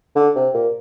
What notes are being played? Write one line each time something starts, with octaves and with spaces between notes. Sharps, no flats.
D3
C3
A#2